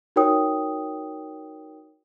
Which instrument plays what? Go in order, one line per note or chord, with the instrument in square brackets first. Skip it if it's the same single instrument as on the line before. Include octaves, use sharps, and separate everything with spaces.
[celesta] D#4 F#4 A#4 C#5 G5 D#6